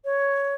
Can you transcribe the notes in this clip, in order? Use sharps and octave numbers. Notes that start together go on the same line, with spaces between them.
C#5